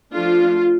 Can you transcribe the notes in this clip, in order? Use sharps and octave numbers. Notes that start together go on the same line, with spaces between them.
F3 A3 D4 F4